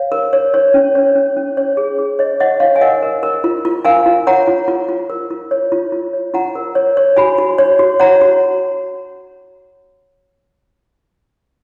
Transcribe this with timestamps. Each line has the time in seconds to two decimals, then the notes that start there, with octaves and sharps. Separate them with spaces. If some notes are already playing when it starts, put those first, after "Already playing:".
Already playing: C#5 F5
0.12 A#4
0.33 C#5
0.54 C#5
0.74 C#4
0.95 C#5
1.15 C#4
1.37 C#4
1.57 C#5
1.77 G#4
1.99 G#4
2.19 C#5 D#5
2.40 C#5 D#5 F#5
2.60 C#5 F5
2.76 G#5
2.81 A#4 D#5 F#5
3.03 A#4
3.23 A#4
3.44 F4
3.65 F4
3.85 A#4 F5 G#5
4.06 F4
4.27 C#5 F#5 A#5
4.47 F4
4.68 F4
4.89 F4
5.10 A#4
5.30 F4
5.51 C#5
5.72 F4
5.92 F4
6.13 C#5
6.34 F4 F#5 A#5
6.55 A#4
6.75 C#5
6.97 C#5
7.17 F#4 G#5 B5
7.38 F#4
7.58 C#5
7.79 F#4
8.00 C#5 F#5 A#5
8.21 F#4